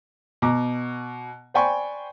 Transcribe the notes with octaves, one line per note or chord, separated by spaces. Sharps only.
B2 A#5 D6
C5 D5 G5 G#5 B5 C#6